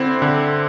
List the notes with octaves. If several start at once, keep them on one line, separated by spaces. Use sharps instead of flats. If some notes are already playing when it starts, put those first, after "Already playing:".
Already playing: D3 C4 E4
D3